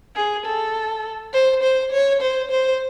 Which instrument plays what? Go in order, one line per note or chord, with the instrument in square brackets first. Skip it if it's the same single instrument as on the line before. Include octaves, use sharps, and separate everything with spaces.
[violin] G#4
A4
C5
C5
C#5
C5
C5